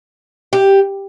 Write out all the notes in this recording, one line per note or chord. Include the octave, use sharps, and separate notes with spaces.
G4